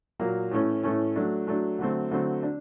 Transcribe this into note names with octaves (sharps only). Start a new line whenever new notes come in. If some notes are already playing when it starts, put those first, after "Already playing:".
A#2 F#3 A#3
A2 E3 A3 C#4
A2 E3 A3 C#4
F#3 A3 D4
F#3 A3 D4
D3 F#3 A3 C4
D3 F#3 A3 C4
D4